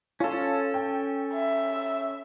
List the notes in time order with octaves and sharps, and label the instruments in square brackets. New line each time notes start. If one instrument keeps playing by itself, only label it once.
[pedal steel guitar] C#4 A4 [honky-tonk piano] F4
[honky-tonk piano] G5
[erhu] E5